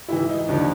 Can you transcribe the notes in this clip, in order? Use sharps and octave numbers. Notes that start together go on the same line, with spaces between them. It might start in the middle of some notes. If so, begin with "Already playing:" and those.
G#2 E3 E4
D#4
D#2 D3 F3